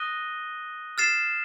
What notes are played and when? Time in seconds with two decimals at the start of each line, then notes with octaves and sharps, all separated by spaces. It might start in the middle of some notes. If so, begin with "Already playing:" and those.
Already playing: D#6 F#6 A#6 D#7 G7
0.98 F6 A6 C7 E7